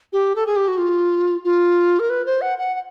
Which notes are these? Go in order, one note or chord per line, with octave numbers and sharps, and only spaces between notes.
G4
A4
G#4
G4
F#4
F4
F4
A#4
B4
C5
F#5
F#5
F#5